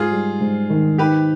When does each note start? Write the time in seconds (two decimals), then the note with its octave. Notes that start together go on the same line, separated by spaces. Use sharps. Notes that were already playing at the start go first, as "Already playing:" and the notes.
Already playing: G#2 F4 G#4
0.11 G3
0.40 G#2
0.70 D#3
0.98 D#4 G4 B4